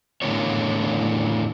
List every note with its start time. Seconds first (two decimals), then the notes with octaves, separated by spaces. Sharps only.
0.22 A2 D3 E3 A#3 B3 C#5